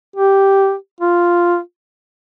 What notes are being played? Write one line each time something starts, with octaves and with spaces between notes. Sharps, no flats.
G4
F4